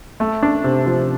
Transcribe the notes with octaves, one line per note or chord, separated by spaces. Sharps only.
A3
D4
C3
F3